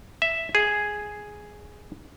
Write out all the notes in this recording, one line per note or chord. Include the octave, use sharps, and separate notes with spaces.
E5
G#4